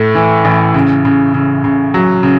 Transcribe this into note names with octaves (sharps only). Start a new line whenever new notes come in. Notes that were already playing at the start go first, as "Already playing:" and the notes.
Already playing: A2 A3
E3
A1
C#3
C#3
C#3
C#3
F#3
C#3